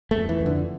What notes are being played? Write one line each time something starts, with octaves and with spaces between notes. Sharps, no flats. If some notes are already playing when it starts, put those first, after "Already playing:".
A3
F2
E3
F2
D3